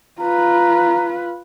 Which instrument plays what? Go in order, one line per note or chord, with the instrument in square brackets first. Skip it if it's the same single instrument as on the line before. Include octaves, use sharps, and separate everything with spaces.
[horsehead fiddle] F4 B4 [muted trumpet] A#5